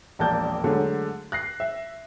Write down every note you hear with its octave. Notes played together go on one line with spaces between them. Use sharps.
E1 A#1 A#3 D5 A5 G6
D3 F#3 G#3 A3 D4
F#6 A#6 C7
E5